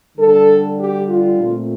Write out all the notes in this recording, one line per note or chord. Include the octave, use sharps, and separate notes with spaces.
D3 G3 D4 A4
G4
F4
A#2 A3 C4